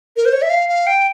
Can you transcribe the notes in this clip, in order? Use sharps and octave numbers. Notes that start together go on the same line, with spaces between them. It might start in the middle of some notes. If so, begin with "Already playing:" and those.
A#4
C5
C#5
E5
F5
F5
G5